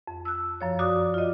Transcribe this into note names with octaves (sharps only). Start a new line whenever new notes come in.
F2
E6 F#6
F#2 F3 C#5
F#4 D5 D6 D#6 F#6
F4 D#5